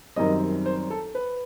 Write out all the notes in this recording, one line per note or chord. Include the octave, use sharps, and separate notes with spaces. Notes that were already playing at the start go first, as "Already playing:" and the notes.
F#2 D#3 G3 C4 D#5
C5
A4
B4